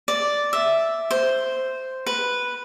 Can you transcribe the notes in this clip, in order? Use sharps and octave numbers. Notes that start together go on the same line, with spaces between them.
D5
E5
C5
B4